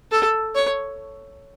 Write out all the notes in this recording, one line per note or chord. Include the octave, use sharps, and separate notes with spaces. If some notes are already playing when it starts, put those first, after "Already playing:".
A4
C#5